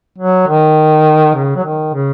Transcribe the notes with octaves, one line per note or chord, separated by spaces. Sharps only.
F#3
D#3
C#3
F#3
D#3
C#3